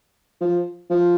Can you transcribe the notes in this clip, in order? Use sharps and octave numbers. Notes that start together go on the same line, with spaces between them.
F3
F3